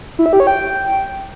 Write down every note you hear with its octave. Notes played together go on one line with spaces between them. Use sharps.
E4
E5
G4
C#5
G5